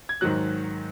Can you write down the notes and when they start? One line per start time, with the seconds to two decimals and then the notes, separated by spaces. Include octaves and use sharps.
0.09 G#6
0.21 G#2 D#3 F#3 F#6